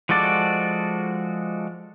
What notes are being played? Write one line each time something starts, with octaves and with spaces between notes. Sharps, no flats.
F3 G#3 F#4 A4 D5